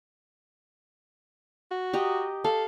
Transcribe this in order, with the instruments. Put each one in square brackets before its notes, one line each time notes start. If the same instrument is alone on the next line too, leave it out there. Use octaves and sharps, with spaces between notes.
[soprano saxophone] F#4
[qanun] G4 D#5 A#5
[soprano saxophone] A4 [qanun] F5